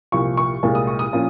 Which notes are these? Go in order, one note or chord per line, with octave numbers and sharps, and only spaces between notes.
C2 A#2 F3 C#6
C#6
C2 A#2 G#3
D#6
C#6
D#6
A#2 F3 A#3 C#4